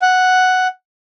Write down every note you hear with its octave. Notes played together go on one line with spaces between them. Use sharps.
F#5